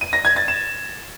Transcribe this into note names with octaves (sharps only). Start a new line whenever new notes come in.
D#7
A#6
G#6
A6
E7